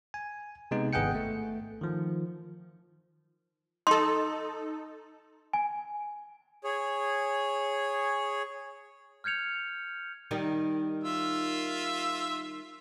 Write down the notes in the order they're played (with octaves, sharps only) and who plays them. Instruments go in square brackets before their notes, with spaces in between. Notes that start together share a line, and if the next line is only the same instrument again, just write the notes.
[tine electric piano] G#5
C3 G#3 B3 D#4
G#1 B3 G#4 F#5 G5 C#7
A3
D#3 F3
[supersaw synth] D#4 A4 [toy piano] C6
[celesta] G#5
[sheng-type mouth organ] G#4 C#5
[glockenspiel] F6 G6 G#6 C#7 F7
[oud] D#3 G3 D#4
[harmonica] F4 E5 E6